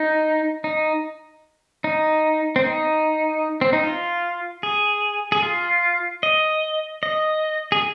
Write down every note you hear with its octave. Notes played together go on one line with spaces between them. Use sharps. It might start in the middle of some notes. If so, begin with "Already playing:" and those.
Already playing: D#4
D#4
D#4
C4
D#4
C4
D#4
F4
G#4
G#4
F4
D#5
D#5
G#4